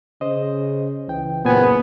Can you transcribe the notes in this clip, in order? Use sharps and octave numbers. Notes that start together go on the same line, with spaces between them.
C#3 C5 D#5
C#2 E3 G5
F#1 A#2 B3 C5 G#5